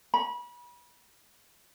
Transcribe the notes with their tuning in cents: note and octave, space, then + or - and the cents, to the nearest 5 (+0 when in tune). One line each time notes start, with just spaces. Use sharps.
B5 -30